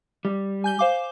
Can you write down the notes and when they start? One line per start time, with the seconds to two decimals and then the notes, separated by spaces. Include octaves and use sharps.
0.25 G3
0.64 G#5 G6 G7
0.79 C5 F5 D6